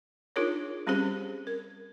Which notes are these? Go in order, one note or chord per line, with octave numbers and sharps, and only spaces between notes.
D4 D#4 F4 G#4 A#4 C#5
G3 C4 C#4 G4 G#4 C5
A#4